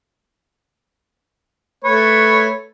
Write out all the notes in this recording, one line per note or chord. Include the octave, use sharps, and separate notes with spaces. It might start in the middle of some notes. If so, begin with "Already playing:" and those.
A3 B4 C#5